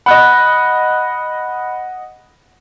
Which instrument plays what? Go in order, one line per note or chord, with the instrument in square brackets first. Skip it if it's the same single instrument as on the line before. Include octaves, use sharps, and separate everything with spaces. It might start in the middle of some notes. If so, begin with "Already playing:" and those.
[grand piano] D#5 F#5 [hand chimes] B5 F#6